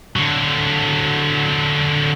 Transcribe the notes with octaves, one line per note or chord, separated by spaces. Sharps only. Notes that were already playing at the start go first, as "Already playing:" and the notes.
D3 F#3